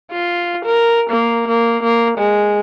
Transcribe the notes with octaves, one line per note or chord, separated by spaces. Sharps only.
F4
A#4
A#3
A#3
A#3
G#3